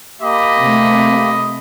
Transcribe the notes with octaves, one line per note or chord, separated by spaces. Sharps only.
A#3 G4 D#5 B5
C3 A3